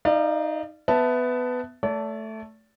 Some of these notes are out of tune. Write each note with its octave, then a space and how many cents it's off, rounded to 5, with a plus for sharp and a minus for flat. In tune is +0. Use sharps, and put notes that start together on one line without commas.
D#4 +5 D5 +35 F5 -30
B3 +15 E5 +0 A5 +5
A3 +0 D5 -40 A5 +5